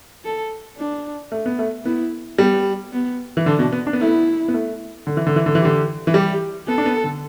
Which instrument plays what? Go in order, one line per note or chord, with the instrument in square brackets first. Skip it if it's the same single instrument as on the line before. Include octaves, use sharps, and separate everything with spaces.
[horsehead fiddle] A4
D4
[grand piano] A3
B3
A3
[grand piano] B3 [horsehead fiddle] E4
[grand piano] G3 [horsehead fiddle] B3
[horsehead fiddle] B3
[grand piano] E3
[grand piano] D3 [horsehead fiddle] D4
[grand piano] B2
B3
D4
B3
[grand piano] A3 [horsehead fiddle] E4
[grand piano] B3
B3
A3
D3
E3
D3
E3
D3
E3
[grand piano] D3 [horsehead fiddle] G4
[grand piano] E3
[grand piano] G3 [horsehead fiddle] G4
[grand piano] B3 [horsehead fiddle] A4
[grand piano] D4
B3
D3